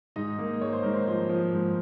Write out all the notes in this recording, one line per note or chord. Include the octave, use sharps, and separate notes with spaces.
G#2 D#4 D#5
A#3
G#2 C#5
C5
G#2 A#4
C5
F3 C5
F3
G#2